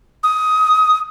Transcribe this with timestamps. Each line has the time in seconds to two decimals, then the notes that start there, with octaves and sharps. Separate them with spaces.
0.24 D#6